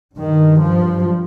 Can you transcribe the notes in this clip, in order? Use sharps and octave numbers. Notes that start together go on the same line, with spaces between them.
G2 D#3
F3